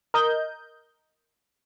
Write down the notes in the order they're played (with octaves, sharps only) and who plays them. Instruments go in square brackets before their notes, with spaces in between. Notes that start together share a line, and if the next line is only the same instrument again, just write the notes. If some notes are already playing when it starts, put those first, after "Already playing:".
[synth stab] A#4 D#5 G6